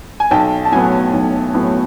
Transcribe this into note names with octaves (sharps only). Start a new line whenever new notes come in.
G#5
B1 G5 A5
A5
A2 F#3 B3 F#5 G#5
B1
A2 F#3 B3